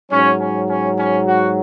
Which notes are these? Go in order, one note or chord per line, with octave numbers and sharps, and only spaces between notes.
G#2 F#3 C#4
C#4
C#4
C#4
F#4